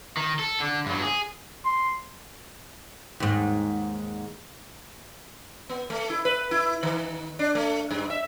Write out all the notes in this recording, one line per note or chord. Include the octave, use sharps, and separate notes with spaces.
D#3
A4
D3
G2 F#3
G#4
C6
D#2 G#2
B3
A3
E4
B4
E4
D#3
D4
A3
G2
E5